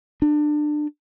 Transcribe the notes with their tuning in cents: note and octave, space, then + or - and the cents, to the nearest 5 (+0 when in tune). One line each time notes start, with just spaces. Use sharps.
D4 +25